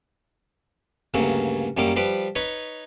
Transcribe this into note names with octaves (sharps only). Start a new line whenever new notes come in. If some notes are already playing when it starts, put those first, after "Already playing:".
D2 G2 C#3 F#3 A#3
F#2 F#3 G3 A#3 D6
F3 G3 B4 D6
D#4 B4 C#5